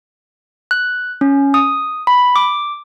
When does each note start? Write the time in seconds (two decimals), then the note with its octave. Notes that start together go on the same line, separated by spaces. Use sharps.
0.71 F#6
1.21 C#4
1.54 D#6
2.07 B5
2.36 D6